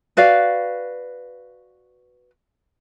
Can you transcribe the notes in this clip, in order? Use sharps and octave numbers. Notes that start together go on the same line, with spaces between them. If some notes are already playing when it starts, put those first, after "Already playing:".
F#4 B4 D5 F5